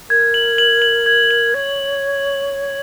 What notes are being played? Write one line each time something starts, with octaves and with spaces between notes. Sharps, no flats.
A#4 G#6
F#7
F#7
F#7
G#6
F#7
C#5 G#6